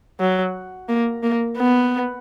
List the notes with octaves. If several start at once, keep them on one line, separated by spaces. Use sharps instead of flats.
F#3
A#3
A#3
B3